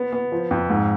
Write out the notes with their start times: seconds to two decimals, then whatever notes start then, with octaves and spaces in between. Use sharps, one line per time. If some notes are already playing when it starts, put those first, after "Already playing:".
Already playing: B3
0.13 B3
0.32 F3
0.51 F2
0.69 G#2